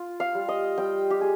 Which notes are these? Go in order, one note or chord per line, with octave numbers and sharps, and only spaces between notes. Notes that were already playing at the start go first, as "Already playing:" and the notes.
Already playing: F4
F5
G3
D#5
G3 G5
G4
G#4